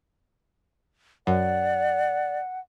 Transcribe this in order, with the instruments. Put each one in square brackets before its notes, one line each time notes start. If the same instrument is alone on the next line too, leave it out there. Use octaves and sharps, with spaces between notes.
[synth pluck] F#2 [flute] D5 [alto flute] F#5